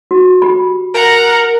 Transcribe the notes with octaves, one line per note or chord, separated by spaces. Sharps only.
F#4
G4 B5
A#4 F#5 A#5